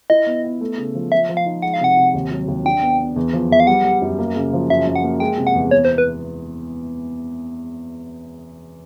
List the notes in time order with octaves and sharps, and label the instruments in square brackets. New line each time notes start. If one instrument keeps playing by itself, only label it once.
[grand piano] E4 [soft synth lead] D#5
[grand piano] B3
B3
A3
C#3
F3
[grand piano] F3 [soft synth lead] E5
[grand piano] F3
[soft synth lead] F5
[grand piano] D#4
[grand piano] G#3 [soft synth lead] F#5
[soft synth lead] F5
[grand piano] C3 [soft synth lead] F#5
[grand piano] C3
D#2
F#3
D#2
[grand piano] D4 [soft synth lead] G5
[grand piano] B3
B3
E2
F3
[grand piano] E2 [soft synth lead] E5
[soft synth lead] F5
[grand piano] G3 [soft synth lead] F#5
[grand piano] G3
F#2
A#3
C#3
F3
[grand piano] F#2 [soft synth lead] E5
[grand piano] F#2
[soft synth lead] F#5
[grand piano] A#3
[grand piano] G#3 [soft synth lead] G5
[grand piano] C3
[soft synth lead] F#5
[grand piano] E2
[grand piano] B3 [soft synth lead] C#5
[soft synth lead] C5
[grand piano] B3
[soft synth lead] B4